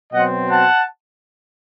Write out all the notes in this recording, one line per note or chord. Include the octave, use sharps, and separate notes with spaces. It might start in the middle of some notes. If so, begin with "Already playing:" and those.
B2 F#3 C4 D#5 F#5
F#5 A5